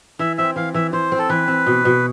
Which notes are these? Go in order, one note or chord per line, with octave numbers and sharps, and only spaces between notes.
E3 E5
C4 E5
E3 F5
E3 E5
E3 C5
C4
A4
E3 B4
C4
B2
B2